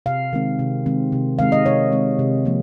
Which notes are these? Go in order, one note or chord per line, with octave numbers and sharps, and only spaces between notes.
C3 F5
D#3 G#3 C4
C3
D#3 G#3 C4
C3
D#3 G#3 C4 F5
D#5
C3 C#5
D#3 G#3 C4
C3
F3 A#3